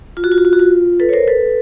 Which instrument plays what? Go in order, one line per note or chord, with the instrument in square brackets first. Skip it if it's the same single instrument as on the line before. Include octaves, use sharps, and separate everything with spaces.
[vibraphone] F4
F#4
F4
F#4
F4
F#4
F4
A4 B4
C#5
A#4 C5
A4 B4